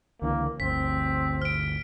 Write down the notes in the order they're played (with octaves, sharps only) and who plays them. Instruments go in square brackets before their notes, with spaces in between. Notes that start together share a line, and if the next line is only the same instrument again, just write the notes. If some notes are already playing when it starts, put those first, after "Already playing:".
[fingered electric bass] C#2 D3 E3 [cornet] A#3
[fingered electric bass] G1 D2 [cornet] C4 [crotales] B6
[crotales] F6 D7